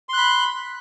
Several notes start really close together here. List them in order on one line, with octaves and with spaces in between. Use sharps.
C6 F#6 B5